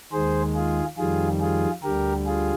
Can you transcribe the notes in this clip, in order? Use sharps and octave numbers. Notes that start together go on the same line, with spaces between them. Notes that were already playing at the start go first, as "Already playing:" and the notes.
D#2 D#3 G#3 G#4 C5
F4 G#4
F2 D#3 G3 F4 G#4
F4 G#4
D2 D3 G3 G4 A#4
F4 G#4